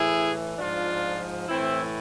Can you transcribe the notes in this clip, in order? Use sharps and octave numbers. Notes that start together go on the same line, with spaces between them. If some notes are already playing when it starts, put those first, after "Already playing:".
Already playing: A2 E3 E4 G#4
G#2 F3 D4 F4
A2 E3 C4 E4